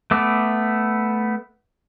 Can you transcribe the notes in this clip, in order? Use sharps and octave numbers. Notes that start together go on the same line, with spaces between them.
A3 B3 D6